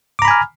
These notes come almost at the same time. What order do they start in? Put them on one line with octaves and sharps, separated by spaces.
D6 A#5 B5 G#5 F6